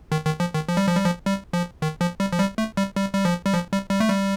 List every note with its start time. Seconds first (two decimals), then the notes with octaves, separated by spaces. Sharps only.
0.12 D#3
0.26 D#3
0.40 F3
0.54 D#3
0.68 F3
0.77 G3
0.87 F3
0.96 G3
1.04 F3
1.26 G3
1.53 F3
1.82 D#3
2.01 F3
2.20 G3
2.33 F3
2.39 G3
2.58 A3
2.77 G3
2.97 G3
3.14 G3
3.25 F3
3.45 G3
3.53 F3
3.72 G3
3.91 G3
4.00 A3
4.10 G3